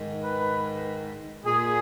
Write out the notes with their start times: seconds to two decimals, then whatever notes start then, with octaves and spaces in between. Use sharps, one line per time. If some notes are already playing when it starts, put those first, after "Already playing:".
Already playing: G#2 D#3
0.22 B4
1.44 A#2 G#4